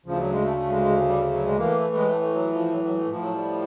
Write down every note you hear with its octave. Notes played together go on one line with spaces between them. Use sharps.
D2 C#3 F3
F#3
G#3
A3
A3
G#3
G#3
G3
F#3
G#3
A2 E3 A#3
A3
A3
G#3
A3
A3
F#3
F3
F#3
F#3
A3
A2 F3
F#3
G3